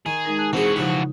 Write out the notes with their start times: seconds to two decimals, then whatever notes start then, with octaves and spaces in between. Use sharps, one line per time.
0.06 D#3 G#4
0.25 G#3 D#4 A#4
0.37 A5 F#6
0.53 E3 C4 F#4 G#4
0.76 C#3 F3 D#4 G4